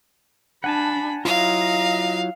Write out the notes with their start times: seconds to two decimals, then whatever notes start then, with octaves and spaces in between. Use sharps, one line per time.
0.64 D4 F#5 G#5 A5 B5
1.25 F#3 E4 F4 D#5 F5 A#5